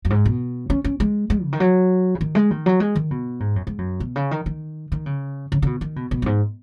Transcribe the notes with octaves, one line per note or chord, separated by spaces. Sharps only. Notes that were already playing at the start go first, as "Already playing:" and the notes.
F#2
G#2
B2
C#4
C#4
G#3
G#3
C#3
D#3
F#3
C#3
D#3
G#3
D#3
F#3
G#3
D#3
B2
G#2
F#2
G#2
F#2
B2
C#3
D#3
D#3
D#3
C#3
C#3
C#3
B2
D#3
B2
B2
F#2
G#2